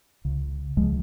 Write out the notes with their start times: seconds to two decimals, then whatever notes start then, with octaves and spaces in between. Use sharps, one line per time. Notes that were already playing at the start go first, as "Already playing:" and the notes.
0.25 C#2 C#3
0.77 C#2 C#3 F3 G#3